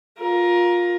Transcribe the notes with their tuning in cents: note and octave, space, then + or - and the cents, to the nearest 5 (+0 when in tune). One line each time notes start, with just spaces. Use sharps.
F4 +15 A#4 +20